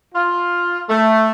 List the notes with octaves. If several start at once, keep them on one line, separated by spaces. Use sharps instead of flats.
F4
A3